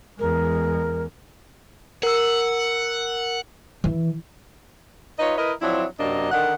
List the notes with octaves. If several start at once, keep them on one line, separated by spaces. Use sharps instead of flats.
E2 G#3 A#4
A#4 F#5 E6
E3
D#4 F4 B4 C#5 D#5
E4 A#4 B4 D#5
F3 F#3 C4 D4 E4
F#2 C3 F#3 A#3 D4 D#5
D3 D#3 F#5